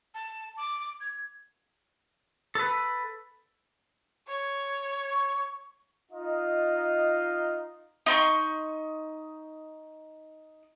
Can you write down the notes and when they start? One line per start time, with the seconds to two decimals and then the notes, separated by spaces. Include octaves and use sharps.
0.15 A5
0.57 D6
1.01 G#6
2.55 A4 B4
4.28 C#5
5.12 C#6
6.11 D#4 F4 D#5
8.06 D#4 C6 C#6